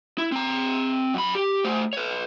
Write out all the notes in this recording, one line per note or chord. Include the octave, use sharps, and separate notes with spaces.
E4
C4 A#5
F#2 B5
G4
A3 C5
B4 C#5